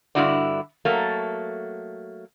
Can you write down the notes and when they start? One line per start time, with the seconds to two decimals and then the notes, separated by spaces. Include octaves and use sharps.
0.15 G2 D3 F3 E4 F#4 D5
0.85 F#3 A3 A#3